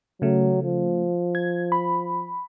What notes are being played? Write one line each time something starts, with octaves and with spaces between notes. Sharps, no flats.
C#3 F#3 A3
F3
G#6
B5